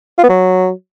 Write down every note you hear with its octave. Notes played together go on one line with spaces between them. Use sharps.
F4
B3
F#3